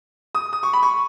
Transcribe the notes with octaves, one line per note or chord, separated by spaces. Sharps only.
D#6
D#6
C#6
B5
C#6